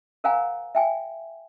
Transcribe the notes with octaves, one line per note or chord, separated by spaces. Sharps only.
A#4 C5 F5 F#5 G#5 A#5
E5 G5 G#5